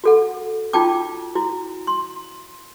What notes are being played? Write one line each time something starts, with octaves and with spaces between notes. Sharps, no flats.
F#4 A4 F#5
D#4 F4 F#4 G5 A5 D6
E4 F#4
C6